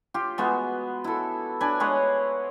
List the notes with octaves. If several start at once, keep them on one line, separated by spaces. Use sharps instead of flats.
F4 G4
G#3 B3 F#4
E4 A4
D4 B4 G#5
G#3 B4 C#5 F#5